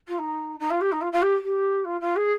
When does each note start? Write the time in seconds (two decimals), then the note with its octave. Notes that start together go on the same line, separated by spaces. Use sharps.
0.07 F4
0.18 D#4
0.59 D#4
0.70 F4
0.80 G4
0.91 D#4
1.01 F4
1.12 F4
1.22 G4
1.43 G4
1.84 F4
2.00 F4
2.16 G#4